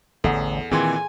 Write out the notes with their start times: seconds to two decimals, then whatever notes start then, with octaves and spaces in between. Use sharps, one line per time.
0.24 A1 E2 D3 A4 F#5
0.71 A#2 D#3 E3 C4 G#4 G#5 C6